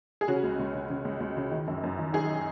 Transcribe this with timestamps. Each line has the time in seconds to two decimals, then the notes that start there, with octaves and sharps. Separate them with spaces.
0.21 G#4
0.28 C#3 C#4 F#4
0.44 C#2
0.59 C#2
0.74 C#3
0.90 C#3
1.05 C#2
1.20 C#2
1.37 C#3
1.51 D#3
1.68 F#2
1.84 F#2
1.99 D#3
2.13 D#3 D#4 G#4